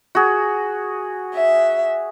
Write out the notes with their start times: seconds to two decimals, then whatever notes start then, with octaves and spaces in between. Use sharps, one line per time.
0.15 F#4 G#4
1.35 E5